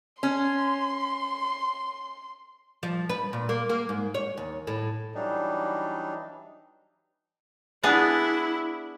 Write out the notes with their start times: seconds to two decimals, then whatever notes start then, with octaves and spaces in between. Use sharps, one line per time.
0.23 C#4 C6
2.83 F3
3.09 B4
3.33 A#2
3.49 A#3
3.69 A#3
3.89 G#2
4.14 C#5
4.37 D#2
4.67 A2
5.15 E3 F#3 G3 D4 D#4
7.83 B3 D4 E4 G#4